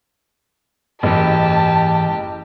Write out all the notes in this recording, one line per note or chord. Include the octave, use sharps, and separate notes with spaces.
F#1 G#2 E3 G4 A5